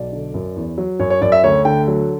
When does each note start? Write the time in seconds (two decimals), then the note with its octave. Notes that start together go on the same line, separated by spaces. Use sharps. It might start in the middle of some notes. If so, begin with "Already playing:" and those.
Already playing: B1 D5
0.12 D3
0.34 F#2
0.56 E2
0.78 F#3
0.99 F#2 C#5
1.10 C#5
1.22 F#2 D5
1.32 E5
1.43 D2 C#5
1.65 D3 G5
1.88 F#3